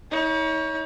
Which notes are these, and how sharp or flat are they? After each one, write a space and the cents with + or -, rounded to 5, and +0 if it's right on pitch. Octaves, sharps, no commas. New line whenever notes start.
D#4 +45 C#5 +15